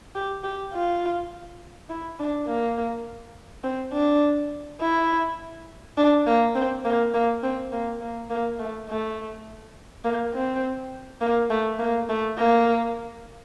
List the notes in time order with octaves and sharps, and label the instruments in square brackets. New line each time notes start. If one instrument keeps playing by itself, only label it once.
[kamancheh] G4
G4
F4
E4
D4
A#3
C4
D4
E4
D4
A#3
C4
A#3
A#3
C4
A#3
A#3
A#3
A3
A3
A#3
C4
A#3
A3
A#3
A3
A#3